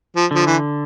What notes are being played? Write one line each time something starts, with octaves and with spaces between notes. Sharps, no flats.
F3
D3 F3
E3